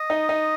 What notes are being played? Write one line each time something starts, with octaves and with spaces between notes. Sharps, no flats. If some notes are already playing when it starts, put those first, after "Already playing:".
Already playing: D#5
D#4
D#4